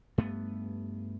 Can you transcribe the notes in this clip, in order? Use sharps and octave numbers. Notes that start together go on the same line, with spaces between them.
G2 A3 B3